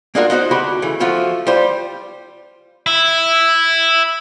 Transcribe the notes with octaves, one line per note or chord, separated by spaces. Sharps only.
A#3 D4 D#4 F4 F#4 A#4
B3 D#4 F#4 C5
D2 F#4 G4 B5 C6
C#3 E3 A3
F3 A3 F4 F#4
G3 F4 C5
E4